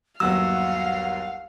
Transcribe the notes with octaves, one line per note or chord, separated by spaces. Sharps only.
G1 D#2 F#3 F5 F#5 E6